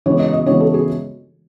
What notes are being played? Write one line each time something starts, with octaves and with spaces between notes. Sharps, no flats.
C#3 E3 G#3 B3 C#5
D#5
D#5
C#3 E3 G#3 B3 C#5
A4
G#4